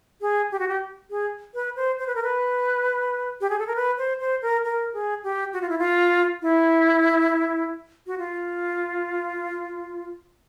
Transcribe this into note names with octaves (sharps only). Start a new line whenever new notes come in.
G#4
G4
F#4
G4
G#4
B4
C5
C5
B4
A#4
B4
G4
G#4
A4
A#4
B4
C5
C5
A#4
A#4
G#4
G4
F#4
F4
E4
F4
E4
F#4
F4